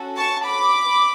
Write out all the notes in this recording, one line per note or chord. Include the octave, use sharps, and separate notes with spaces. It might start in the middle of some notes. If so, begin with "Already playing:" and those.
Already playing: C#4 F#4 A4
A5 C#6
B5 D6